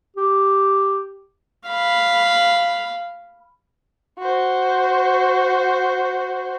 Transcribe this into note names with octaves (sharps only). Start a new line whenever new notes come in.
G4
F5 B5
F#4 C5